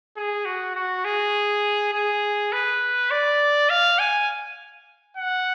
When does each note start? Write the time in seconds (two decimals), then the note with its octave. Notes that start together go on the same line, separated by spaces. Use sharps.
0.17 G#4
0.46 F#4
0.75 F#4
1.05 G#4
1.93 G#4
2.52 B4
3.11 D5
3.70 F5
3.99 G#5
5.17 F#5